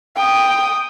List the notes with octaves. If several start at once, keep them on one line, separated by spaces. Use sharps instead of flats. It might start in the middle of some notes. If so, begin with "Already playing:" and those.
G5 D#6